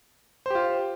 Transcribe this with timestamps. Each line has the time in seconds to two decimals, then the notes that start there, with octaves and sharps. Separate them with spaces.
0.46 C5
0.50 G4
0.55 F4